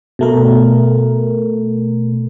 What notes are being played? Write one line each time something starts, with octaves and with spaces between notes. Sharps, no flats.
B2 A3 A#4